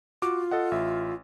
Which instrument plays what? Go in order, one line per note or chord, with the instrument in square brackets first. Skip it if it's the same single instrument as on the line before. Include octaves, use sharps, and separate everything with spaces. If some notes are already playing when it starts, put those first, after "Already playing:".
[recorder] F4 [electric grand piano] F#4 D6
[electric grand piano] A4 D#5 F#5
A1 E5